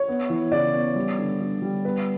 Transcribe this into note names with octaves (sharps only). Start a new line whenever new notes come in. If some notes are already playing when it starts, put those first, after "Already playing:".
Already playing: C#5
B3
E3
C#3 D5
B3
G3
D3
D3
G3
B3 B4